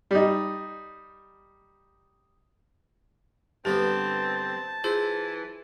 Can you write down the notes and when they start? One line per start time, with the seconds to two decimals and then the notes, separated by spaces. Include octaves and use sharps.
0.11 G3 D#4
3.65 G2 D3 B3 C4 G4 A5
4.84 E3 F4 G#4 C5